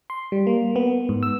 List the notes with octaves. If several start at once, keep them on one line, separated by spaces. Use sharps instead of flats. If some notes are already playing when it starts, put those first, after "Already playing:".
C6
G3
A#3
B3
G#2
E6